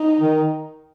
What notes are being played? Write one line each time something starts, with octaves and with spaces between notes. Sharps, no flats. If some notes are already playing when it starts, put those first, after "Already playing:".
Already playing: D#4
D#3